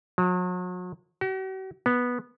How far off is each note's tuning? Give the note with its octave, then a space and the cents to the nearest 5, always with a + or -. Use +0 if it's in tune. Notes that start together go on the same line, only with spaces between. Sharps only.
F#3 -40
F#4 +45
B3 -10